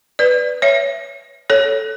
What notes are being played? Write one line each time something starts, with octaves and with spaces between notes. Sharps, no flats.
B4 D5
C#5 E5
A4 C#5